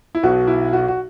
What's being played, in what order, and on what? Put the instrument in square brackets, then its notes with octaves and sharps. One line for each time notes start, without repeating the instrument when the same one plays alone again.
[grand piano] E4
B1 B2 F#3 F#4
E4
F#4
F#4